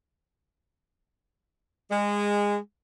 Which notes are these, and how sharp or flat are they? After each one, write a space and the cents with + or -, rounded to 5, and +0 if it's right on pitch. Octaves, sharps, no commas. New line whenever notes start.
G#3 -20